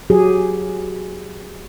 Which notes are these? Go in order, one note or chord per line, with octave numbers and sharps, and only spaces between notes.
F#3 G4 G#4